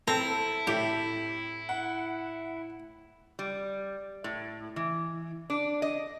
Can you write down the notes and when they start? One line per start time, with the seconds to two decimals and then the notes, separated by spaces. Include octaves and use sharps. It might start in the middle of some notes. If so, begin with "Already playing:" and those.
0.08 C4 E4 A4 A#5
0.67 A2 G4
1.69 F#5
3.39 G3
4.24 A2
4.76 E3
5.50 D4
5.82 D#5